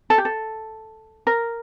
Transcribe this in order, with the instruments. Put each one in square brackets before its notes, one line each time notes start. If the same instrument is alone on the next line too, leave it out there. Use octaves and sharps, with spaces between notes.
[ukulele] A4
G4
A4
A#4